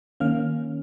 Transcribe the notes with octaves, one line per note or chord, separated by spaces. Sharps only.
D#3 A#3 C#4 F5 F6